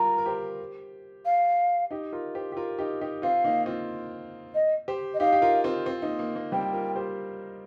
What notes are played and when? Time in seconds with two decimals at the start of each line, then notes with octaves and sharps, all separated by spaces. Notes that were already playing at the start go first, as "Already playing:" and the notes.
Already playing: G3 F4 A#4 A#5
0.18 A#4
0.26 G4 C5
1.25 F5
1.91 D#4 G4
2.12 F4 A#4
2.35 G4 C5
2.52 G4
2.57 F4 A#4
2.79 D#4 G4
3.01 D#4 G4
3.22 C4 F4 F5
3.44 A#3 D#4
3.66 C4 F4
4.55 D#5
4.88 G4 C5
5.14 D#5
5.20 D#4 G4 F5
5.33 G4
5.42 F4 A#4
5.64 C4 F4
5.86 C4 F4
6.02 A#3 D#4
6.19 A#3
6.36 A#3
6.52 G3 C4 G5
6.73 F4 A#4
6.96 G4 C5